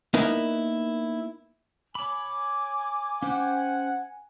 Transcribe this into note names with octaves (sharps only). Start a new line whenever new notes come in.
A#3 B3 D#4 E4 A#4 B4
C#5 G#5 B5 D6
C#4 C5 F#5 G5